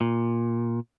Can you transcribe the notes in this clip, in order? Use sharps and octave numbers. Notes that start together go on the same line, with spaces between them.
A#2